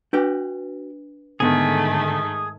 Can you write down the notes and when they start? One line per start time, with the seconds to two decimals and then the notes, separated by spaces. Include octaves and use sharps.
0.13 D4 F#4 B4 G5
1.40 G#2 D3 D#3 A3 B3 G#4